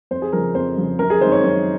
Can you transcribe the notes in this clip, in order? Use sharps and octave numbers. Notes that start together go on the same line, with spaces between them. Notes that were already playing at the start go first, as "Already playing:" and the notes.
F2 C5
G#4
C#3 F3 A#4
F2 C5
C#3 F3
F#2 A#4
G#4
D#3 G#3 C4 C5
C#5
F#2 C#5